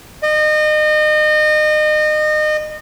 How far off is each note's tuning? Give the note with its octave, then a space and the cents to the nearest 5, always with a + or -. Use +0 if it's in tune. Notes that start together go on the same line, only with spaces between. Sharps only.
D#5 -30